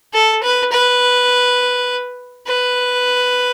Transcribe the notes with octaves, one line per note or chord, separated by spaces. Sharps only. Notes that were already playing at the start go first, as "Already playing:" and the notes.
A4
B4
B4
B4